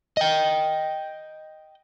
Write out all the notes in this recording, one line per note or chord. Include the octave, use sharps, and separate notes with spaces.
D#5 G5